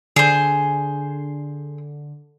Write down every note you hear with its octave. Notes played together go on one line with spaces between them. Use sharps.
D3 G#4 C5